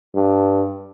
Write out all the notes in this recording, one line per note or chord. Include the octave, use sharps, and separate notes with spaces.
G2